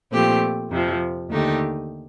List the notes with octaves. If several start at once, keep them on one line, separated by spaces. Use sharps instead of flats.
A#2 F3 A3 C4 G4
F2 C3 F3
D#2 D3 A3 D#4 G4